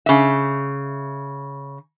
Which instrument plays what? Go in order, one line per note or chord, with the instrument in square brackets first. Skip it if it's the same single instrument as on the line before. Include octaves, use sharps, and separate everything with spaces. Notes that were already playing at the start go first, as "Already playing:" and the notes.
[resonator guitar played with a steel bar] C#3 E5